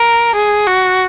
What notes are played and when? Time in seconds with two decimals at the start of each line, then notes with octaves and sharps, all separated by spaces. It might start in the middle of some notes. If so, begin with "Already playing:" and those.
Already playing: A#4
0.35 G#4
0.66 F#4